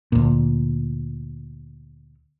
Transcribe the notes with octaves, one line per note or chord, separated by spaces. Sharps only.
D2 A#2